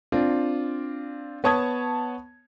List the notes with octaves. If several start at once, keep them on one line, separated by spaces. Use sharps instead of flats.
C4 D4 F4
B3 C#5 A5 D#6 G#6